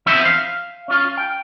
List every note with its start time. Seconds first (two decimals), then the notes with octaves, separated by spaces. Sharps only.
0.06 E3 F3 B3 C4 D#4 E5
0.25 F5
0.88 C#4 F4
1.18 G5